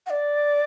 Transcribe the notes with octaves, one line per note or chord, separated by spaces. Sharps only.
F#5
D5